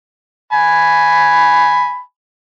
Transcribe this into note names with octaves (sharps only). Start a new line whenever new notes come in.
G#5 B5